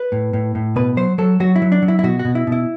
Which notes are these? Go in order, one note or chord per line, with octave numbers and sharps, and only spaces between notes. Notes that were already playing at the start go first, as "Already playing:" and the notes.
Already playing: B4
A2
A2
A2
B2 B4
F#3 C5
F#3 A4
F#3 F#4
E4
F#3
D4
F#3
E4
E4
B2 F#4
F#4
B2
E4
B2
E4